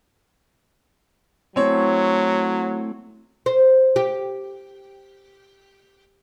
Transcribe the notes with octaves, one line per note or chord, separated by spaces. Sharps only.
F#3 A3 C4 E4 C#5 G#5
C5
G4